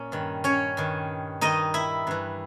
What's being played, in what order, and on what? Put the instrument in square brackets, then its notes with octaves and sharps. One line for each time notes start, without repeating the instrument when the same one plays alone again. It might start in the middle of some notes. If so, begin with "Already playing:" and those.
Already playing: [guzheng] A#2 A#3 C#4
G2 D#3
C#4 C#5
G2 D#3
G2 D#3 D#4 D#5
E4 E5
G2 E3